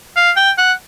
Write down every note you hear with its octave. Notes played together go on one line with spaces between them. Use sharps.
F5
G5
F#5